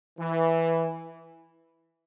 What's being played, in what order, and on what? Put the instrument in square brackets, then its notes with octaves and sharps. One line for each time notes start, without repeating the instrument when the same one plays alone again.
[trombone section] E3